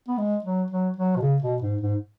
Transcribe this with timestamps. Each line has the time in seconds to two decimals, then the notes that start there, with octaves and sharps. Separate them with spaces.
0.08 B3
0.18 G#3
0.45 F#3
0.71 F#3
0.97 F#3
1.16 B2
1.22 C#3
1.43 B2
1.62 G#2
1.81 G#2